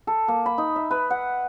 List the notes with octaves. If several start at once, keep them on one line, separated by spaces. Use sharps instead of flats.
A4
A#3
B5
D#4
E5
B4
F#5